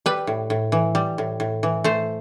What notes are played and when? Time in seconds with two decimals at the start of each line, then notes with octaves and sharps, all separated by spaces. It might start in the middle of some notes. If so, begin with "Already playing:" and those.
0.06 G3 B4
0.27 A2
0.50 A2
0.72 E3
0.95 G3
1.18 A2
1.40 A2
1.63 E3
1.84 A3 C5